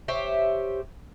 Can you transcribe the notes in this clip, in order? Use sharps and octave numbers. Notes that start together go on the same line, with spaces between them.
G4 C5 C#5 E5